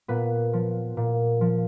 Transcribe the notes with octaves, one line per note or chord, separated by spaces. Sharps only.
A#2 B3 B4
F3
A#2
F3